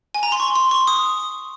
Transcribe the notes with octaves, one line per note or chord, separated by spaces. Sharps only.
G#5
A#5
C6
C#6
C6
C#6
D#6